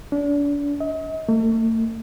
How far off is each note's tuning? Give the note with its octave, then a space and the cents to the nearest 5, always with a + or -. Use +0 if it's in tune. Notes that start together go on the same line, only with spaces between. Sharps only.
D4 -35
D#5 +40
A3 +40